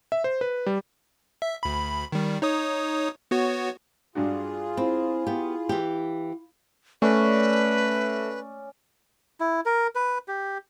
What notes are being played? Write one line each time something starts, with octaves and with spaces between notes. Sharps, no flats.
E5
C5
B4
G3
E5
D2 B5
D#3 G3
D#4 C#5 D#6
B3 F#4 C#5
G2 D4 F4 F#4 G#4
C4 E4 F5 B5
B3 G4
E3 G4
A3 C#4 B4 D5
E4
A#4
B4
G4